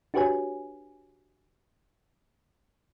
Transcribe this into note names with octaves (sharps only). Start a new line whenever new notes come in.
D4 F#4 G4 B4 C#5 G#5